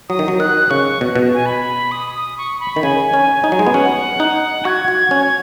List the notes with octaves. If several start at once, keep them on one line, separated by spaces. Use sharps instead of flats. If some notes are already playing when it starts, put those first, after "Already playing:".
F#3 D#6
D#3
F#3
D#3 F#6
C#3 C#6
B2
B2
G#5
B5
D#6
D#6
C#6
B5
D#3
C#3 G#5
C#4
D#4
F#3
G#3
B3
C#4 F#5
D#4
F#4 G#6
F#4
C#4